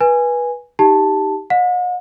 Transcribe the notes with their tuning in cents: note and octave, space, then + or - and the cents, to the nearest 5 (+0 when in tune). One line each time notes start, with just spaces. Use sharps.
B4 -20 G#5 -5
D#4 +20 G4 +0 A5 +0
D#5 -35 F#5 -45